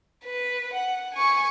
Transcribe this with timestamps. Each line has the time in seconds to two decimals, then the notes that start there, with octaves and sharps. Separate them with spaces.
0.24 B4
0.74 F#5
1.15 G#5 C#6